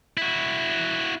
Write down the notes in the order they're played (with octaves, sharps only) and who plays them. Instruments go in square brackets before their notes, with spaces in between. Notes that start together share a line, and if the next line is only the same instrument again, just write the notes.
[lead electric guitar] E4 F#4